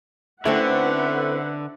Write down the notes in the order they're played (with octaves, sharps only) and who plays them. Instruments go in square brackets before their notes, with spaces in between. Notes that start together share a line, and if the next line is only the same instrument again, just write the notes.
[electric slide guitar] D3 [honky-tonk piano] A3 [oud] C4 C#4 E4 [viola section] B4 E5 F#5